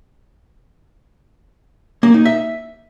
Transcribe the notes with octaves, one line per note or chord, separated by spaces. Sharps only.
A#3
D#4
E5